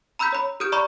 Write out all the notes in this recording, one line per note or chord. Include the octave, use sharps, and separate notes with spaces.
A#5 B5 E6 F#6 G6 B6
C#5 B5
G4 D#6 F6 G6 D7 E7
D5 A#5 B5 C#6 G6 E7